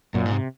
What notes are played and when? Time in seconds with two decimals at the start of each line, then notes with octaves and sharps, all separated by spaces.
0.14 F#2 A#2
0.26 G#2
0.32 C3